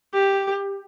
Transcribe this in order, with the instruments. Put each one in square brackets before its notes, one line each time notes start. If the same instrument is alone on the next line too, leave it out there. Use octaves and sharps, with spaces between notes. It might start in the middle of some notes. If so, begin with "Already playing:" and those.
[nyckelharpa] G4